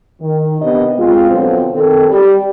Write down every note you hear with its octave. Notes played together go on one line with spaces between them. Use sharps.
D#3
C3 D#3 B3 D4 D#5
G#3 C4 F4
B2 D3 F3 F#3 C4
D#3 C4 A4
G3